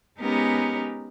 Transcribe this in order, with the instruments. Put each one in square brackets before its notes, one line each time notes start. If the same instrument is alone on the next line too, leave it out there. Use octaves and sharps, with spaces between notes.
[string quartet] G#3 B3 C#4 D#4 G4 A#4